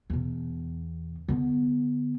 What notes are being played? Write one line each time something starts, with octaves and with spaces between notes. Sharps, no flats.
E2 B2
D3 B3